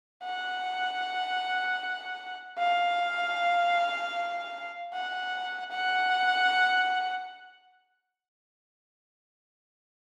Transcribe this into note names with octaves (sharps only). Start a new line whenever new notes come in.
F#5
F5
F#5
F#5